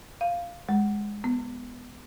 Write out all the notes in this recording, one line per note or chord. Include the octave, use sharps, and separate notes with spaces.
F5
G#3
B3